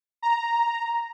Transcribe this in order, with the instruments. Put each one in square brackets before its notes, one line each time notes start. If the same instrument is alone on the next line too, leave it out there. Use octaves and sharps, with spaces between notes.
[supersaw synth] A#5